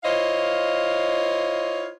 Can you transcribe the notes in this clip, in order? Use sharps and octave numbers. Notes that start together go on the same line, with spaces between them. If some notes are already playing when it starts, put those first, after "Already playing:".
E4 F4 C5 C#5 D#5 F5